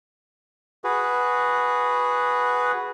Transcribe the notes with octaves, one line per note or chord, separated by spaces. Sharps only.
F#4 G#4 B4